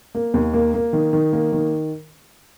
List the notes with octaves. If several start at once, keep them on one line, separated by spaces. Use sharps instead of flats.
A#3
D#2
A#3
A#3
D#3
D#3
A#3
D#3